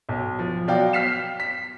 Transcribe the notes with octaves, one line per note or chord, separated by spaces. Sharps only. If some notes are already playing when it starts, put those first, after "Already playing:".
B1
F3
B2 F#3 D5 F5 G5
F6 B6 C7 E7
B6